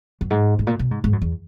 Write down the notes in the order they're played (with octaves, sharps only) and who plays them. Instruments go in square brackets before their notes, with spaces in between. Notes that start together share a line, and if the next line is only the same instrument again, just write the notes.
[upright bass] F#2
G#2
G#2
A#2
B2
G#2
G#2
F#2
E2